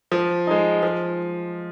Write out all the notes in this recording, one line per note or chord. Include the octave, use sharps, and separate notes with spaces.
F3
G#3 D#4
F3